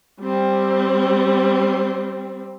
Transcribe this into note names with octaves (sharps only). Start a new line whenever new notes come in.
G3 C4